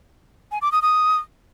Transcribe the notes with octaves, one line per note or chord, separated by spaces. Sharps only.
G#5
D6
D#6
D#6